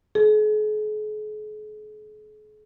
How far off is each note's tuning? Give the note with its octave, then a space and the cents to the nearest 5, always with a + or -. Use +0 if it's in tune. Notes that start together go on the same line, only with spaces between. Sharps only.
G#4 +45